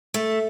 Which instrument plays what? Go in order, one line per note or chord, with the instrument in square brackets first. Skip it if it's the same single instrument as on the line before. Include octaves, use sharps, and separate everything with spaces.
[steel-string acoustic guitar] A3